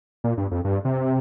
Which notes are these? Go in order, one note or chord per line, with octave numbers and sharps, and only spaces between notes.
A#2
G2
F2
G2
C3